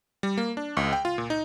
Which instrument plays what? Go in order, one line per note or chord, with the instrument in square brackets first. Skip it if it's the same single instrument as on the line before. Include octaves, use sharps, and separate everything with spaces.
[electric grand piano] G3
A#3
D4
C#2
G5
F4
A#2
D#4